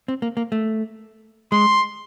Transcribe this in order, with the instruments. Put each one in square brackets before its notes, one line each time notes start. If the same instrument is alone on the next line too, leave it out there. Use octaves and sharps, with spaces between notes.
[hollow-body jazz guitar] C4
A#3
A#3
A3
[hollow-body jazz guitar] G#3 [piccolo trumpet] C6